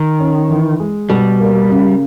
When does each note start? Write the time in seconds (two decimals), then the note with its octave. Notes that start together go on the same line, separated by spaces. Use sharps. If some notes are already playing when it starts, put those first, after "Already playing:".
Already playing: D#3
0.19 C#4
0.49 E3
0.80 G#3
1.09 B2 G3
1.40 A#3
1.70 C#3